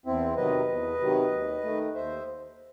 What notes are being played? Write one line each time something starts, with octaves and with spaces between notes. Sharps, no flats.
E2 C4 E4
C3 D#3 F#3 B4 D#5
E2
C3 D#3 F#3
D#2
D#3 A3
D#2 C5 E5